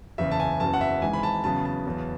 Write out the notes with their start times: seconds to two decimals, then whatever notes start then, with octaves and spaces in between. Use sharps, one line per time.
0.18 F#1 E2 C#3 E5
0.31 A5
0.40 G#5
0.60 F#1 E2 C#3 F#3 A5
0.73 F#5
0.81 E5
1.02 G#1 G#2 E3 G#5
1.13 B5
1.23 A5
1.44 E2 C#3 F#3 B3 A5
1.65 A5
1.86 E2 C#3 F#3 B3